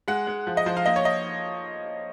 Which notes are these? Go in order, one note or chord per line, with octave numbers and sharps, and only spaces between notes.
G#3 F#5
G#3
F3
D#5
F3 C5
F5
A#3 D#5
C#5
D#5